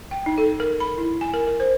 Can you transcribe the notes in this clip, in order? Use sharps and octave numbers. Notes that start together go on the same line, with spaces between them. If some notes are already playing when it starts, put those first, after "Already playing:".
G5
D#4
A4
A#4
B5
E4
G#5
A#4
A#4
C5